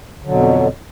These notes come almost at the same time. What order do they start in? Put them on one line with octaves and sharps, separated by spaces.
D3 F#3 B2 F2